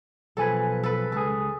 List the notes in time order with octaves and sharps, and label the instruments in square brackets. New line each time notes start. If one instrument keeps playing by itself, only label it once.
[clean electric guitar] B1 F3 G#5 [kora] A4 B4
[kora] A4 B4
[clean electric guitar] C#2 G#4 [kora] A4